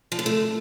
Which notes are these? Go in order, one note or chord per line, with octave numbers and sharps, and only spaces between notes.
F3
D3
A3